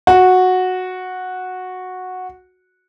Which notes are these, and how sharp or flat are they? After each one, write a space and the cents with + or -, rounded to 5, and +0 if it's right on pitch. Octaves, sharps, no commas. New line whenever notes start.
F#4 -10